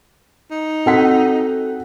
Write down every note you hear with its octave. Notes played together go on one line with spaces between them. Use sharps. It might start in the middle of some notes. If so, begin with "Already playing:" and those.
D#4
C4 F#4 A4 F#5 B6